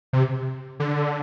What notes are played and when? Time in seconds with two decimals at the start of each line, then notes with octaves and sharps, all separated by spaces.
0.13 C3
0.80 D3